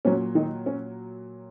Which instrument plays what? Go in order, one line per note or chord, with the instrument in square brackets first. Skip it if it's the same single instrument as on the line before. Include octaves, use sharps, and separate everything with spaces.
[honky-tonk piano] A#2 F#3 C#4
D#3 D#4
C#4